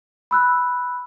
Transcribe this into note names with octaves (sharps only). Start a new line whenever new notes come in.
B5 E6 F#6